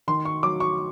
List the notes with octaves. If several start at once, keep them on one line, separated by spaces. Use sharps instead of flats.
D#3 C6
C#6
F#3 D6
C#6